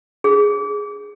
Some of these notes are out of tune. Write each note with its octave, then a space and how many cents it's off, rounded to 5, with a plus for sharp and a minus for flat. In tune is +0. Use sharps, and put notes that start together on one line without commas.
G#4 +0